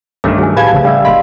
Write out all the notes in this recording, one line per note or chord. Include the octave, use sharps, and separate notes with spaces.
G1 C2 G2 D#3 A3 C#4 D6
F#3 G#4 G#5
A2 G4 B4 F5 A5 G#6
A#1 C#3 A3
G3 C#4 E5 F5
G1 A#2 D#5 F5 B5 C6